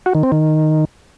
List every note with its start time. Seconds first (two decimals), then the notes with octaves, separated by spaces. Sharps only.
0.06 F#4
0.15 D#3
0.23 C4
0.32 D#3